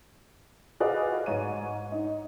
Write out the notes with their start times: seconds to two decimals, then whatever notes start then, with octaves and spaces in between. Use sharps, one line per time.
0.80 F#4 G#4 B4 D5 D#5 F5
1.26 G#2 C#5 D#7
1.92 D#4